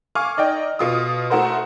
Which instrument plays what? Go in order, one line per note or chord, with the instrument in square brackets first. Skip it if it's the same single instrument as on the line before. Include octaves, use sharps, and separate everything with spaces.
[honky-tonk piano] F5 G#5 C#6 D6 F6
D#4 D5 D#5 G5
B2 F4 D#6
A3 E4 F#4 A#4 C5